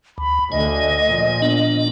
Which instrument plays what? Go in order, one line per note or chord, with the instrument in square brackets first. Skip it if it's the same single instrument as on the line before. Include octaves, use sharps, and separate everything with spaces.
[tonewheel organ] D2 [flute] B5
[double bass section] D2 D3 [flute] D#5 [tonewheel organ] G#5
[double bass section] A#2 F3
[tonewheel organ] B3 D4